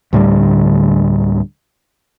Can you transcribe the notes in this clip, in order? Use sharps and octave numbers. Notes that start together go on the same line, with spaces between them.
D2 A2 D3 G3